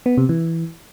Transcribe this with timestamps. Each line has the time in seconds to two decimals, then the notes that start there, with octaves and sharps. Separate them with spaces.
0.06 B3
0.17 C3
0.29 E3